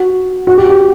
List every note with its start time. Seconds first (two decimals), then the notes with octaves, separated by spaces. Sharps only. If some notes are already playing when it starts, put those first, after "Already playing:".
Already playing: F#4
0.47 F#4
0.58 G4
0.69 G4